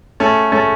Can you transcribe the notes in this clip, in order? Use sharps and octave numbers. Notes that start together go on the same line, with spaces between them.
A3 C#4
A3 C#4